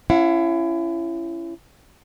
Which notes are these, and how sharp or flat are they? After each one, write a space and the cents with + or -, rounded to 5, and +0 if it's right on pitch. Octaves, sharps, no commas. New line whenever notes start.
C#4 +0 E4 +30 F#5 -35